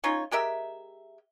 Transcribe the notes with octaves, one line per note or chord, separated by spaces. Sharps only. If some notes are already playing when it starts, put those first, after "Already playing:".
C#4 D#4 F4 C#5
G#3 G4 A#4 E5